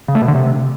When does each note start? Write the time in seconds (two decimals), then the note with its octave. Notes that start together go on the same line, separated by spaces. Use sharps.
0.08 C#3
0.15 A3
0.22 B2
0.28 D3
0.35 C3